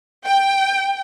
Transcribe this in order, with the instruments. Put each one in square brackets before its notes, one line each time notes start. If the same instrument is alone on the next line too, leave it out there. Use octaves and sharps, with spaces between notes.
[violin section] G5